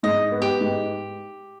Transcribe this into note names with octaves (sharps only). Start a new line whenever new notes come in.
G#2 D#5
B3
G4
G#2